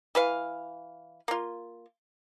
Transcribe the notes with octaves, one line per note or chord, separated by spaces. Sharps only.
E3 B4 F5
A#3 F4